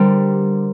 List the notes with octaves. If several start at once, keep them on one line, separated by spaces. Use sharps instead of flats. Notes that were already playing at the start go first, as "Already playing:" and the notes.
Already playing: D3 G3 A#4 C5